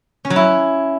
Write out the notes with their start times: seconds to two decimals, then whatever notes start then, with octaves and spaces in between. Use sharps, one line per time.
0.25 C#4
0.30 F#3
0.36 E4